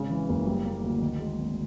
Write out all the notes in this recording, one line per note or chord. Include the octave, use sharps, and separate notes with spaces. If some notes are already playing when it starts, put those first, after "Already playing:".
Already playing: G#1 C#3
E3
F#1
G3
A#3
D2
D#3
G#3
G#1